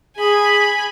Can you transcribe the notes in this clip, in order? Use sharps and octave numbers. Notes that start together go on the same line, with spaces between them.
G#4 G#5 B5